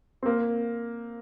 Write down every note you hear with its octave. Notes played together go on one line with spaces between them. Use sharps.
C4
A#3